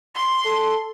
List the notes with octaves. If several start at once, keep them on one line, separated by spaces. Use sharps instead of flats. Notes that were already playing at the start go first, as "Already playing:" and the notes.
C6
A4